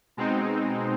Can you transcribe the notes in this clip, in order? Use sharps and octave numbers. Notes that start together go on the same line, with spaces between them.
B2 G#3 C4 D#4